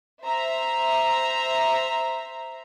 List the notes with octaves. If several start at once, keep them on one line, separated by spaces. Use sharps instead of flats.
C5 E5 A#5